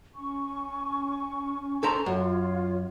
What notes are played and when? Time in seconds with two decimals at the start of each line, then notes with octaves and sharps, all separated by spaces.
0.14 C#4 G#5 C#6
1.83 A4 C5 A#5
2.06 F#2 F4 C#5